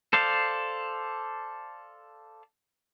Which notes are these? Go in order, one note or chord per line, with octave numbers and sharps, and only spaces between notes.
A4 C5 D5 F5